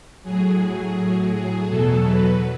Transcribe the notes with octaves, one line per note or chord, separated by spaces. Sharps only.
A2 F#3 G#4
A2 F#3
G#4
E2 B2 F#3 A4
B4